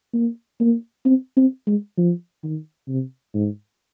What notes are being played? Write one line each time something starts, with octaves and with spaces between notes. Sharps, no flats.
A#3
A#3
C4
C4
G#3
F3
D#3
C3
G#2